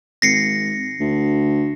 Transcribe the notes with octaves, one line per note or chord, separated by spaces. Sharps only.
G#1 A#6 C7 C#7
D2